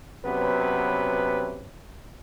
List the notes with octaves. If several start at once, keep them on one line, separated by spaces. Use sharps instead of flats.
C3 F#3 B3 C#4 B4